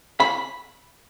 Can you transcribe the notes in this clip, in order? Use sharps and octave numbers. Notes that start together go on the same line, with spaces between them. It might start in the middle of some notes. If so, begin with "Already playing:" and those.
B5